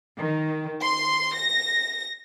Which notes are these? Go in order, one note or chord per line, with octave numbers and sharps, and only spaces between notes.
D#3
C6
A#6